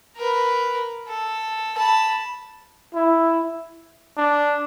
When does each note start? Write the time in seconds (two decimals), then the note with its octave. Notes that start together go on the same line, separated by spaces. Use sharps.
0.17 A#4 B4
1.08 A4
1.77 A5 B5
2.94 E4
4.18 D4